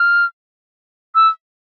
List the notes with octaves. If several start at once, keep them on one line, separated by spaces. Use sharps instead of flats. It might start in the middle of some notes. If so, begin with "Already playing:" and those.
Already playing: F6
E6